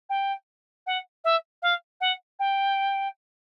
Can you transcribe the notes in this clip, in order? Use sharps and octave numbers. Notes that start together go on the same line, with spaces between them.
G5
F#5
E5
F5
F#5
G5